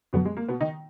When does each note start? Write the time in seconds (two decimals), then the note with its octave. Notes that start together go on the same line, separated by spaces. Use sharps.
0.13 F#2 B2 D3 F#3 B3
0.25 G#3
0.37 A#3
0.48 B2 B3
0.61 D#3 D#4